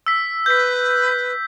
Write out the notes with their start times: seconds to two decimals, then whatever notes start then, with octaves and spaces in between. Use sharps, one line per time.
0.06 E6 B6
0.46 B4 G6 B6